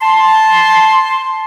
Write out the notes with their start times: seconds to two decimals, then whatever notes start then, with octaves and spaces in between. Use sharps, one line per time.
0.02 A5 C6